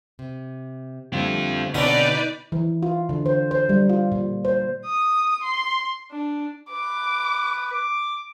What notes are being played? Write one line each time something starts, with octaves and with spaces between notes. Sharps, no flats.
C3
D3 G3 A3 C4 F4
B2 D3 C4 C#4 D#4 B4 D5
E3
F4
D3
C5
C5
G3
F4
A#2
C5
D#6
C6
D4
B4 D6
D6